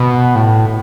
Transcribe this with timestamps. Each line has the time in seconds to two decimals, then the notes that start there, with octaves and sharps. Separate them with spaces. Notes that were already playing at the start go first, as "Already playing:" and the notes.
Already playing: B2
0.35 A2